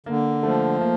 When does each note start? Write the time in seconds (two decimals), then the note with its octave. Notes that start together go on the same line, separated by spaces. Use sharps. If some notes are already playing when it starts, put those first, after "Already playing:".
0.06 D3 A#3
0.43 F3 A3
0.81 A#3